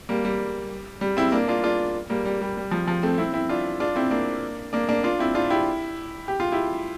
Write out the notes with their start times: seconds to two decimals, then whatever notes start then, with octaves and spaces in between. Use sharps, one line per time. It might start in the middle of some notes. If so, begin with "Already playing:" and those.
0.09 G3 A#3
0.25 G3
1.01 G3
1.17 C4 E4
1.32 A#3 D4
1.48 D4 F4
1.64 D4 F4
2.10 G3 A#3
2.25 G3
2.42 G3
2.57 G3
2.71 F3
2.87 F3
3.03 A3 C4
3.18 C4 E4
3.34 C4 E4
3.49 D4 F4
3.80 D4 F4
3.96 C4 E4
4.11 A#3 D4
4.73 A#3 D4
4.89 A#3 D4
5.04 D4 F4
5.19 C4 E4
5.35 D4 F4
5.50 E4 G4
6.28 G4
6.40 F4
6.52 E4 G4